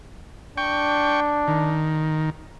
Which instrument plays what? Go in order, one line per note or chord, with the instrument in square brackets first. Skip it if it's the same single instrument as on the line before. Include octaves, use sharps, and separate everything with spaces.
[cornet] D4 [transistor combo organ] G5 C#6
[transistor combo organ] D#3